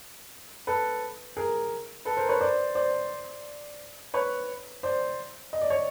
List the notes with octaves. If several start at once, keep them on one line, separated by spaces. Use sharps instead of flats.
A4 B4
G#4 A#4
A4 B4
A#4 C5
B4 C#5
C5 D5
C5 D5
B4 C#5
C5 D5
D#5
D5
C#5